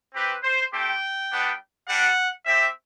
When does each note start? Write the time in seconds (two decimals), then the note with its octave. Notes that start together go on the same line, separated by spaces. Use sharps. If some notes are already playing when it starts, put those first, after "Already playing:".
0.15 C4 G4 B4
0.43 C5
0.72 A3 C4 G4 G5
1.30 G3 B3 D4
1.87 G3 D4 G4 F#5
2.46 C4 G4 E5